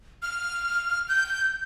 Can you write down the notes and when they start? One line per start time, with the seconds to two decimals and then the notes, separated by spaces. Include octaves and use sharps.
0.22 F6
1.09 G6